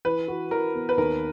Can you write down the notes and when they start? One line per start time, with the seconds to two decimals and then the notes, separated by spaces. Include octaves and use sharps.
0.05 E3 B4
0.28 F#4
0.51 E3 A#4
0.75 B3
0.89 B4
0.97 D#2 A#4